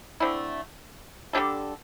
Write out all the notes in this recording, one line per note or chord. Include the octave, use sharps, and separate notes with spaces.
D3 A3 C4 E4
D3 G3 D4 A4